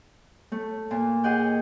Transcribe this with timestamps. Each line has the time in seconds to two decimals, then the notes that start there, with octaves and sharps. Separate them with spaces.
0.52 A3
0.91 A#2
1.23 G#4 D#5 F#5 G5